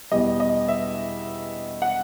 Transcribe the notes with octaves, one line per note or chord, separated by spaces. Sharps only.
E2 B2 G3 D#5
D#5
E5
F#5